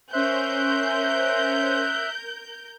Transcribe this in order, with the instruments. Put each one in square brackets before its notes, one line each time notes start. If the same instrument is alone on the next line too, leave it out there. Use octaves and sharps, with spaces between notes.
[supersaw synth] C#4 C5 [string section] A#4 G6 [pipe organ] E5 F#6